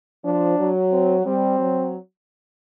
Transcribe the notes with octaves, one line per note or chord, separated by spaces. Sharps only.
F3 D4
F#3
C4
G3 C4
F#3